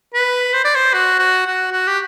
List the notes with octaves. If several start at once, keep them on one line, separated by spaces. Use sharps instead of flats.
B4
C5
D5
C5
F#4
F#4
F#4
F#4
G4